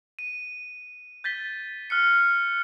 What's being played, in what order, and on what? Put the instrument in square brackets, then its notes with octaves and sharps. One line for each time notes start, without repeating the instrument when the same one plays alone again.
[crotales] D#7
G6 A6 B6 G7
F6 F#6 C#7